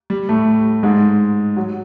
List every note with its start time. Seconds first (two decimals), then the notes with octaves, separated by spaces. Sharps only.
0.10 G3
0.29 A2 A3
0.83 G#2 G#3
1.57 F#3